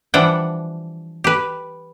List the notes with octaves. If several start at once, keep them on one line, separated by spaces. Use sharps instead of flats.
E3 F3 G3 D4 F#5 G5
G4 B4